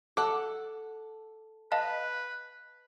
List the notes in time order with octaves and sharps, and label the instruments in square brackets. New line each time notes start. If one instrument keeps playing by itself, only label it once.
[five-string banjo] A4 F#5 [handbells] D6
[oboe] B4 [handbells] D#5 F5 A5